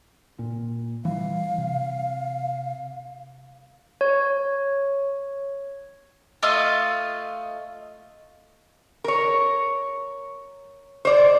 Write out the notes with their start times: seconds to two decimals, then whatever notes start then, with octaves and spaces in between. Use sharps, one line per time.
0.39 A#2
1.05 E3 G3 F5
1.58 C3
4.01 C#5
6.43 A3 F4 D#5 F5
9.04 A#4 C#5
11.05 C5 D5